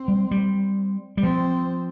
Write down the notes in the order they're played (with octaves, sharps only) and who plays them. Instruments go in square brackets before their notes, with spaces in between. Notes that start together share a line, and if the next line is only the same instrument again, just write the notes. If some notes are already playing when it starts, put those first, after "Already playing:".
Already playing: [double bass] C4
[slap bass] G3
G3
G3
[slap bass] F3 [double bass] C4